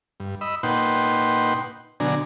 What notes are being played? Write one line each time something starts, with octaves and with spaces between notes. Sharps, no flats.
G2
D#5 B5 E6
A#2 D#4 B4 F#5 G5 C6
B2 D3 F#3 D4 G#5 A#5